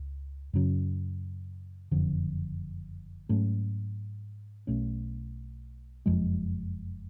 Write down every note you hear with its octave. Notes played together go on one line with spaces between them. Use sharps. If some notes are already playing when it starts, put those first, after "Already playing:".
Already playing: C#2
F#2 C#3 F#3 C#4
F#1 F2 D3 F3
G#2 F#3 A3 C#4
B1 B2 A3 C#4
F#1 F2 F3 G#3